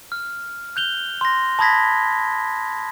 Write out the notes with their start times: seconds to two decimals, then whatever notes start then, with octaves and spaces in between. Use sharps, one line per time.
0.12 F6
0.76 F#6 G6 F7 G7
1.21 C6 A#6
1.59 A5 B5 D#6 G#6 A#6 B6